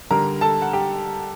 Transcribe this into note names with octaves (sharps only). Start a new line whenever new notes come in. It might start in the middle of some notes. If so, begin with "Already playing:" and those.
D3 G3 A#4 A#5
A4 A5
F#5
G4 G5